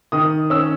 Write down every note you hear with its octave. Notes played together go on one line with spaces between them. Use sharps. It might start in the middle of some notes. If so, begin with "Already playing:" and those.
D#3 D#6
C#4 E6